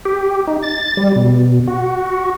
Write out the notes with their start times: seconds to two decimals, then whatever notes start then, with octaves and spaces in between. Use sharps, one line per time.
0.05 G4
0.47 D#4
0.62 A6
0.97 G3
1.16 B2
1.67 F#4